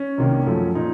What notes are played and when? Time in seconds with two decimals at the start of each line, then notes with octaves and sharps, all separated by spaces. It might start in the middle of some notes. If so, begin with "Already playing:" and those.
Already playing: C#4
0.18 C2 C3 D#3 A#3
0.46 F#2 F3 A3
0.75 A#2 D#4